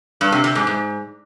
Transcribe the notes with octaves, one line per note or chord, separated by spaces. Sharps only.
G2
C3
C3
G#2
G#2